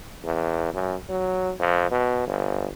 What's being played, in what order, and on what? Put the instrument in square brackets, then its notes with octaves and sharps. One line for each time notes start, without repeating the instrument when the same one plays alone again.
[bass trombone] E2
F#2
F#3
F2
B2
G1